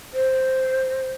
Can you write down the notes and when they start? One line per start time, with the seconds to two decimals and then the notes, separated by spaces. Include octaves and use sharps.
0.13 C5